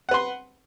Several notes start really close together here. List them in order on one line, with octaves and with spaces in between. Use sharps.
F#5 B4 C6